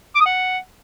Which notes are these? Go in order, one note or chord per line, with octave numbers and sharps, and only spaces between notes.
D6
D#6
F#5